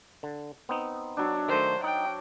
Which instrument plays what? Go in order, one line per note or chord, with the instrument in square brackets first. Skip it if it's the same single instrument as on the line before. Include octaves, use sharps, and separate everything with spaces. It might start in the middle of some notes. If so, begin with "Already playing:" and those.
[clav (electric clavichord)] D3
B3 C4 D#4
[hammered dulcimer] F#3 D4
[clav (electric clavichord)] D#3 A3 [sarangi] C5
[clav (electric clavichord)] D#4 [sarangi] G5